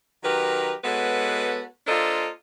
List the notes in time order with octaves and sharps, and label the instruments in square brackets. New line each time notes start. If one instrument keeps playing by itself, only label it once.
[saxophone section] D#3 F#3 G4 A#4 B4
G#3 B3 F#4 A4 B4 C#5
A#3 D4 F4 A4 C5 D#5